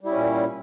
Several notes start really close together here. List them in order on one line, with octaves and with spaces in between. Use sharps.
G3 E4 C#4 A#2